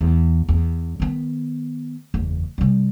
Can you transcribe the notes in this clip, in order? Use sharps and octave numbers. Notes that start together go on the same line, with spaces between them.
E2
E2
D#3 B3
F#1 E2
C3 G3